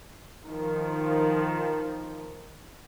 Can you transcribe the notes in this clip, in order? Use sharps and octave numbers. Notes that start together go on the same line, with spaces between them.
D#3 F3